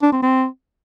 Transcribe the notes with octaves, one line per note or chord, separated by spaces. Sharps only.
D4
C4
C4